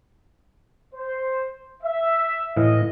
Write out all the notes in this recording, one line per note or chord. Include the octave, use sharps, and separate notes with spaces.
C5
E5
A2 E3 D#5 F5